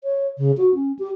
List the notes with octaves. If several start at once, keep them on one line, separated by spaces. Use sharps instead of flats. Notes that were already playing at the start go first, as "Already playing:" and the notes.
C#5
C#3
F#4
C#4
G4